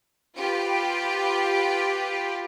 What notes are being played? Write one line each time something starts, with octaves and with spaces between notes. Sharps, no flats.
F4 G4 B4